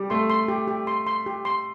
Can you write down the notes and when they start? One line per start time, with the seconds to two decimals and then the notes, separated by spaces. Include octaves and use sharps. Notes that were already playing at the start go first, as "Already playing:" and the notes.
Already playing: G3 G4
0.10 A3 C6
0.30 C6
0.48 G4
0.67 G4
0.87 C6
1.07 C6
1.26 G4
1.45 C6